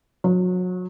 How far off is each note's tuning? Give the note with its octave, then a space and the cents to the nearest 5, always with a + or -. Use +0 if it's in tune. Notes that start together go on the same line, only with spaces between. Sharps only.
F#3 -30